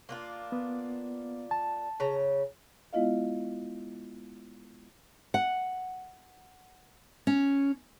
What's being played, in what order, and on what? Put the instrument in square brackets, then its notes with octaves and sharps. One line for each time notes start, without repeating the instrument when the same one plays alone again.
[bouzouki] A#3 D4 F4
[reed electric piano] B3
A5
[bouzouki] C#3 A#5
[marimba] G#3 B3 E4 F4 D#5 F5
[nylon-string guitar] F#5
C#4